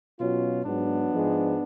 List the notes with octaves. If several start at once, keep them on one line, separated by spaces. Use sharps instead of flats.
B2 F#3 C#4 F4
G#2 F#3 B3 D4
G#2 F3 G#3